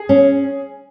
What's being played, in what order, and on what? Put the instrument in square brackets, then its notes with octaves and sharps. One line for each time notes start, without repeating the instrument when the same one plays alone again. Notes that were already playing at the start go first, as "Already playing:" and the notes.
Already playing: [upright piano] G#4
[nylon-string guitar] C#4